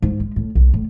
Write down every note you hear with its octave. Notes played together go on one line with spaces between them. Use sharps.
G#2
G#3
A2
B1
A2